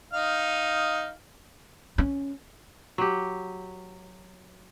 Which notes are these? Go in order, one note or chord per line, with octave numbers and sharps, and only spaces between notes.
D#4 F5
C#4
F#3 G4